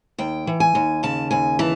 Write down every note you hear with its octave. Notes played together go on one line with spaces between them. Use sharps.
D#2 G5
E3
G#5
D#2
C#3 A5
D#2 G#5
E3 A5